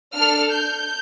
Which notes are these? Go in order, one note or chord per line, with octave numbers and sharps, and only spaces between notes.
D4 A4 F6
G6